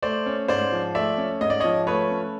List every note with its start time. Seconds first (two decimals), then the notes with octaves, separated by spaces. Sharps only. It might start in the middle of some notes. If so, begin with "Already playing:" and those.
0.02 A3 C5 D5
0.26 C#4
0.48 G#2 C5 D5
0.72 F3
0.95 A3 D5 E5
1.18 C#4
1.41 G#2 D#5
1.50 D5
1.60 F3 C#5 D#5
1.87 A3 B4 C#5
2.10 C#4